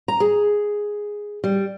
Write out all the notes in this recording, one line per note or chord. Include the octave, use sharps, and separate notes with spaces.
A#5
G#4
G3